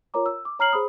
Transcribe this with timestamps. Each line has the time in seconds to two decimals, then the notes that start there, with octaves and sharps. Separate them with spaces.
0.14 F4 A#4 C#5 A#5 D6
0.26 E6
0.45 D6
0.59 C#5 A#5 F6 C7 F#7
0.73 G#4 C5 B5 D#6